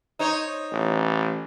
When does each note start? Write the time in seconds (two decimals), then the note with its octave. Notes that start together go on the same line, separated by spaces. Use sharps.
0.19 D#4 C5 C#5
0.72 A1